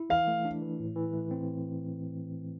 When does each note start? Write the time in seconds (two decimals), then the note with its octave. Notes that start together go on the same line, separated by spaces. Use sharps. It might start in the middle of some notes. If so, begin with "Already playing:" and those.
Already playing: E4
0.10 E3 F5
0.27 A3
0.45 D4
0.62 E3
0.80 A2
0.96 E3
1.13 A3
1.31 C4